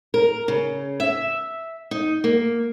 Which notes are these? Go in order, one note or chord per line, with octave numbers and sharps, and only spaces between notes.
A#4
C#3
E5
D#4
A#3